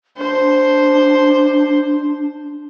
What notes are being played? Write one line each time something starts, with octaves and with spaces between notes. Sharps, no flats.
D4 C5